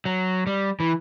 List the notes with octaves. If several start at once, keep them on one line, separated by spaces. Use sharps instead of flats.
F#3
G3
E3